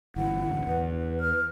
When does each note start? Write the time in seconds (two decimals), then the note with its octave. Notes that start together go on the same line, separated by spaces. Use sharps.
0.16 G1 G2 E3 E4 F#5
0.47 A1 D2 D3
0.67 E2 B4
1.20 F6